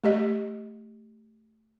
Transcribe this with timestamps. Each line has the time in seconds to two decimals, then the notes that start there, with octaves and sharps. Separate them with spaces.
0.04 A3 G4 D#5